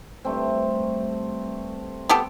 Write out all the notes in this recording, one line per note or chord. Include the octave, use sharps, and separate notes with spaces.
G2 A3 C4
B3 G4 A4